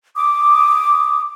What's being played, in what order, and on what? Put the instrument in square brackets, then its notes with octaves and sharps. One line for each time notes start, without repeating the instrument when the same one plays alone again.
[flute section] D6 D#6